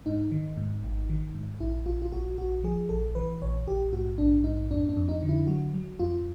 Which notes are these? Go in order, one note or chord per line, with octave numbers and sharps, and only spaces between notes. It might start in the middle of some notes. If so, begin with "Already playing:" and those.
G#2 D#4
D#3
G#2
G#1
D#3
G#2
A#1 E4
A#1 F4
F4
A#1 F#4
A#1 F#4
F3 G#4
A#1 A4
E3 B4
A#1 C#5
A#1 G4
G#2 F#4
A#1 D4
G#2 D#4
F2 D4
D4
F2
D#4
D3
E4
F#3 F#4
F#3
F2 F4